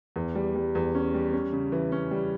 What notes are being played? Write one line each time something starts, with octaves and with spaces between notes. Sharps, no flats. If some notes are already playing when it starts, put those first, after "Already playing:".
E2
G3
G3
E2
C#4
G3
C#4
C#3
E3
C#4
G3